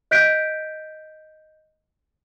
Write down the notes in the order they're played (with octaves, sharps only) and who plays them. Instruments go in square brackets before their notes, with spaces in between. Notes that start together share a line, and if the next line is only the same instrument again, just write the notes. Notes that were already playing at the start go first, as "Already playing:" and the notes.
[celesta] D#5 F#6 G6 B6 D7